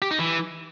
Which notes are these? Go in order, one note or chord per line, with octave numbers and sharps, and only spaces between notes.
G4
D#4
E3